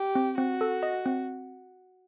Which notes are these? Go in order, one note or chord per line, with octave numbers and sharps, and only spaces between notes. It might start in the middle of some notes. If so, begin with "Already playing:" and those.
Already playing: G4
C4
C4 F#4
A4
D#5
C4